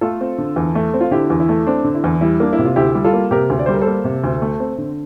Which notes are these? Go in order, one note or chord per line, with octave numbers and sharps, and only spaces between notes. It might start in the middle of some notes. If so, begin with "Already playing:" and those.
A3 F4 A4
C4
D3
E2
A3
C4
F4
D3 E4 G4
E2
E4
A3
C4 D4
D3
E4
E2
G3 E4
A#3 D4
E4
C3
F4
D2 E4 G4
G3
F4 A4
A#3
C3 G4 A#4
D2
D5
G3 C5
A#4
A4 C5
A#3
C3
D2
A3
C4
D3